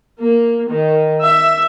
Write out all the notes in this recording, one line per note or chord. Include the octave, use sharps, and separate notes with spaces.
A#3
D#3
E5